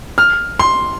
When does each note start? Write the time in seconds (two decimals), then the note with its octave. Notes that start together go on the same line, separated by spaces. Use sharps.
0.18 F6
0.59 C6